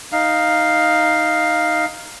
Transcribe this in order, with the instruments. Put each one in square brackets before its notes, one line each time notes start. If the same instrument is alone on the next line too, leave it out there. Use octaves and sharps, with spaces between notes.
[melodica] D#4 F5